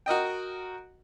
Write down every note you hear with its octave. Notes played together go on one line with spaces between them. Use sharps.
F#4 A#4 D#5 G5